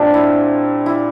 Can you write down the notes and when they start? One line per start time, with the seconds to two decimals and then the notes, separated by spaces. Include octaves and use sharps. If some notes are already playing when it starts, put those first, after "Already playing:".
Already playing: A#2 C4 D4 G4
0.14 E4
0.86 E4